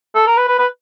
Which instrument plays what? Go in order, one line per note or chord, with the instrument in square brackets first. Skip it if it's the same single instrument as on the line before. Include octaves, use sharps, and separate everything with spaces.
[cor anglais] A4
A#4
B4
B4
B4